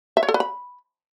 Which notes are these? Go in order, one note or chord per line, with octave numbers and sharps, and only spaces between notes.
E5
C#5
A4
B4
B5